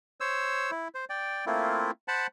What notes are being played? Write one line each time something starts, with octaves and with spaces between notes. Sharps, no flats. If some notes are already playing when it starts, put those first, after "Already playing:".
C5 C#5 E6
E4
C5
D5 G5
A3 A#3 C4 E4 F4
C5 F#5 A5 B5